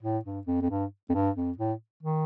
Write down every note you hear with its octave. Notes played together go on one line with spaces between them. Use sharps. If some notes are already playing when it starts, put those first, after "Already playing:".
A2
G2
F2
F2
G2
F2
G2
F2
A2
D#3